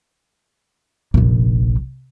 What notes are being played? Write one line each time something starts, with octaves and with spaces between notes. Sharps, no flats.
F1 A#1